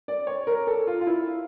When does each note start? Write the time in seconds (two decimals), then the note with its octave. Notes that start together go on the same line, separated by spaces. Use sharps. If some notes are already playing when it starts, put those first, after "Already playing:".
0.08 D5
0.27 C#5
0.47 A#4
0.67 A4
0.87 F4
1.01 F4
1.07 E4